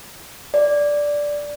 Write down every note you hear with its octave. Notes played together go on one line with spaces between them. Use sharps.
D5